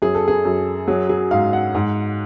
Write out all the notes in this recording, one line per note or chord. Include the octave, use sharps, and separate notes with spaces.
F#2 G#4
A4
G#4
F#2
F#3 G#4
G#4
G#2 F5
F#5
G#2